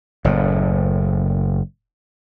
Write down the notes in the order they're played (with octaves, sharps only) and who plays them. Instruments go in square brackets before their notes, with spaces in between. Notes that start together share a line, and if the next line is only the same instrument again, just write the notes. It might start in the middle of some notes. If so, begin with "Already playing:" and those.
[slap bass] F#1 A2